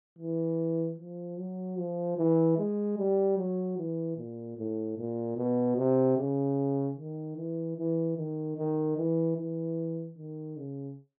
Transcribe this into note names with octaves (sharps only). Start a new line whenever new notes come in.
E3
F3
F#3
F3
E3
G#3
G3
F#3
E3
A#2
A2
A#2
B2
C3
C#3
D#3
E3
E3
D#3
D#3
E3
E3
D#3
C#3